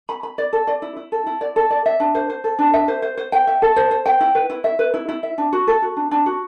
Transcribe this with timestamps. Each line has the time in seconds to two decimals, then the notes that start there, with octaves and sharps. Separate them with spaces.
0.09 B5
0.23 B5
0.38 D5
0.53 A4
0.67 D5
0.82 E4
0.96 E4
1.12 A4
1.26 E4
1.41 D5
1.56 A4
1.70 D5
1.86 E5
2.00 D4
2.15 C5
2.30 C5
2.44 A4
2.59 D4
2.74 E5
2.88 C5
3.02 C5
3.17 C5
3.32 G5
3.47 E5
3.62 A4
3.76 C5
3.91 C5
4.06 G5
4.20 E4
4.35 B4
4.50 E4
4.64 E5
4.79 B4
4.94 E4
5.09 E4
5.23 E5
5.38 D4
5.53 F#4
5.67 A4
5.82 F#4
5.96 D4
6.11 D4
6.26 F#4